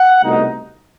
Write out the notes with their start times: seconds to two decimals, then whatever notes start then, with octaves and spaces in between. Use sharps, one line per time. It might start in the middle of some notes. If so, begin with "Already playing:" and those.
Already playing: F#5
0.23 C2 B2 A3 D#4